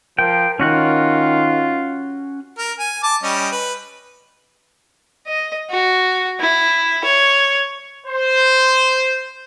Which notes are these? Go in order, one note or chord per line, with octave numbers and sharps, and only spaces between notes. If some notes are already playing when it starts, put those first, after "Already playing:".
F3 A#4 G5
D#3 C#4 F4 F#4 F#6
A#4
G#5
A5 D6
G3 C#4 D#5
B4
D#5
F#4
E4
C#5
C5